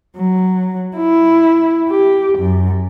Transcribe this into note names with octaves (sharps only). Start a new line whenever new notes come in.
F#3
E4
G4
F#2